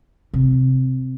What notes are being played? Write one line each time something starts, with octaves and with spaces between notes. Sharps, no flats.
C3